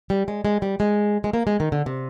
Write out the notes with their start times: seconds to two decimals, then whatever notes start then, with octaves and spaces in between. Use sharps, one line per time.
0.10 G3
0.28 G#3
0.45 G#3
0.62 G3
0.80 G#3
1.24 G#3
1.34 A#3
1.47 G#3
1.60 D#3
1.72 D3
1.86 C3